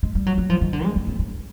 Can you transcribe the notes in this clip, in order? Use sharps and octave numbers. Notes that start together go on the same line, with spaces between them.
G#3
G3
F#3
F#3
F3
D#3
D3
G#3
C4
C4
C#4